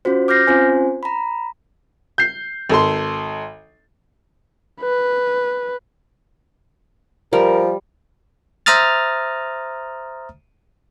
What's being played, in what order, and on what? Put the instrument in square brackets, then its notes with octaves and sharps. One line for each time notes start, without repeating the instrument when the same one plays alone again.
[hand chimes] C#4 F4 F#4 C5
D6 F6 G6 A#6 C7
C4 C#4 F4 C5 G#5
A#5 B5
[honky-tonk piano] G6 C7
G#1 A4 C6
[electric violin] B4
[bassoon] F3 [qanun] G3 [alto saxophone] A#4
[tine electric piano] C5 E5 A#5 D#6 F6 A6